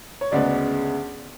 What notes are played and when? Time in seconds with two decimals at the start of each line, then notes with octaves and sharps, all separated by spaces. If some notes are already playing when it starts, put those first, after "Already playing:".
0.21 C#5
0.31 D2 C#3 G#3 B3 D4 D5